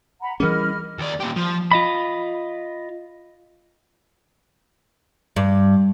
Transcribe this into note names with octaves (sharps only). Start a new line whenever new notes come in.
F#5 A#5 B5
E3 G3 C#4 G#4 A#4 D#5 B5 F6
D#2 D5
A#2 G4
F3
F4 D#5 B5
G2